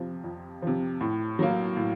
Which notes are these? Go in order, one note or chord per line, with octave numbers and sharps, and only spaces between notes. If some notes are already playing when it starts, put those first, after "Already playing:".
Already playing: F2 C3 F3
F2
C3 F3
A2
F#3 A#3
A2